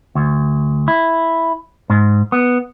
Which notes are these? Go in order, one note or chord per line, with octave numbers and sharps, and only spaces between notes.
D2
E4
G#2
B3